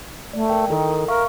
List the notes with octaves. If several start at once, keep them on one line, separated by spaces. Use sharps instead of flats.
A3 D5
A#4 G5
D#3 E4 A4 A#4
A#4 E5 F5 C#6